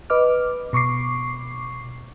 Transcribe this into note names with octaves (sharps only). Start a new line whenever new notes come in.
B4 D#5 D6 F6
B2 C#6 D6 C7